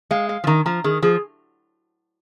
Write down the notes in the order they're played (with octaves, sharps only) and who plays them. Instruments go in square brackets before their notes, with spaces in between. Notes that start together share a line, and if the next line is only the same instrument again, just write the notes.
[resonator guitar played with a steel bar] G#3 [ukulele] F5
[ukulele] F5
[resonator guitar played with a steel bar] F3
[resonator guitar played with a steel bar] D#3 [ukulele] A#5
[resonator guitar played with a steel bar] F3 [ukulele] A#5
[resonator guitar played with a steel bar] D#3 [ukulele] G#4
[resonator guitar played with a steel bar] F3 [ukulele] G#4